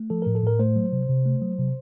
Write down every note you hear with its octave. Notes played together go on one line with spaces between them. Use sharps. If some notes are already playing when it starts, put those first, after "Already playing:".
Already playing: A3
F3 A4
A2 A#4
A4
A2 A#4
A3 C5
F#3
C3
C3
A3
F#3
C3